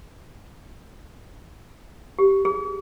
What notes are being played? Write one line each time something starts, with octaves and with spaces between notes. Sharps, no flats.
G4
G#4